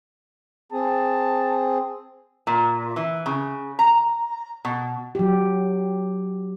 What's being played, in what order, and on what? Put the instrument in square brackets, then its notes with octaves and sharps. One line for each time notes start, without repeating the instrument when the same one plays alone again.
[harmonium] C4 G#4 [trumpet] A5
[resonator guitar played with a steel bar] A#2
E3
C#3
A#5
B2
[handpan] F#3 G4